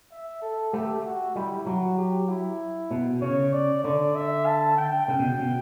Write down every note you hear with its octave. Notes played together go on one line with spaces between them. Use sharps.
E5
A4
A3 G4
F#4
G3 E4
F#3 F#4
G4
E4
B2
C#3 C#5
D5
D3 D5
E5
A5
G5
C#3
B2
C#3
B2